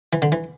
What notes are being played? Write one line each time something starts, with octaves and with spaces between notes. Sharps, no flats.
E3
D3
E3